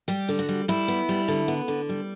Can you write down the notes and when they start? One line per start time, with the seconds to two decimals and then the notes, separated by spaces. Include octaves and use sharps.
0.08 G3 G4
0.29 D3
0.39 F#4
0.49 G3
0.68 G3 E4
0.88 B3
1.09 G3
1.28 D3
1.48 B3
1.68 D3
1.89 G3